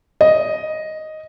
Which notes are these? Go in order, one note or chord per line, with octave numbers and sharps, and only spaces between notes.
D#5